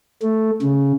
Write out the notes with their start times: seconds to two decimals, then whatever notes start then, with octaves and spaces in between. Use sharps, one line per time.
0.22 A3
0.62 C#3